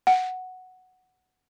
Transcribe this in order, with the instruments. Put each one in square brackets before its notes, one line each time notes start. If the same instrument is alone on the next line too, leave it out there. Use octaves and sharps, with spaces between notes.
[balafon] F#5